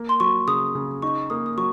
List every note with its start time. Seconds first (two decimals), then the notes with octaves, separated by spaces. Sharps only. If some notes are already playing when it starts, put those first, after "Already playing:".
Already playing: A#3
0.09 C6
0.20 F#3 C#6
0.47 C#3 D#6
0.75 C#3
1.02 D#4 C#6
1.30 A#3 D#6
1.46 D#6
1.58 F#3 C#6